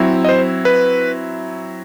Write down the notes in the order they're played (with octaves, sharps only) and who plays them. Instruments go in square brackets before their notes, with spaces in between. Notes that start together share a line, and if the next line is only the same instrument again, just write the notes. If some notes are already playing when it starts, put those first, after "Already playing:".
Already playing: [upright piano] F#3 C4 E4
[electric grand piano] D#5
C5
B4